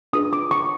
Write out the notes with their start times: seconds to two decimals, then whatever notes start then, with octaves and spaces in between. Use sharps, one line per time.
0.13 D4 F4 G#4 B4 D#6
0.33 D6
0.51 C#6